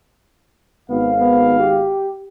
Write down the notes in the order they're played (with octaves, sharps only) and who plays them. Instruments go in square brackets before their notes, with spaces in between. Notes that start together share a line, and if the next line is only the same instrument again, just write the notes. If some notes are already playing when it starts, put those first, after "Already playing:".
[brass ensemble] G#1 F5 [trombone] B3
[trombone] B3
G4